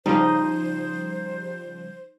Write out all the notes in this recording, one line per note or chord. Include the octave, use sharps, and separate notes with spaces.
C#3 F3 G3 D#4 C5